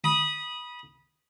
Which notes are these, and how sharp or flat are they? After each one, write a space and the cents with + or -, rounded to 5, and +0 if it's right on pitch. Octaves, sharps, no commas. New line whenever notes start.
B5 -20 D#6 +0